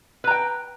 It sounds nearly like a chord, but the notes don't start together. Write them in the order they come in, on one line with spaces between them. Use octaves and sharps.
B4 A#5 G5